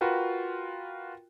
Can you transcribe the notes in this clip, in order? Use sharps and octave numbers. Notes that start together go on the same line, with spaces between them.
F4 F#4 A#4 B4 G5